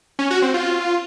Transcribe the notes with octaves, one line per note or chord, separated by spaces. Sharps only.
C#4
F#4
C4
F4